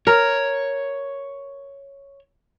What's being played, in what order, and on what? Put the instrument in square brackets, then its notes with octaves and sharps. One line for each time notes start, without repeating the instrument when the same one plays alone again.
[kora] A#4 [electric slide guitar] C#5